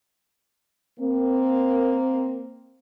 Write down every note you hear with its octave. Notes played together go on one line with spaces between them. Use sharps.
A#3 C4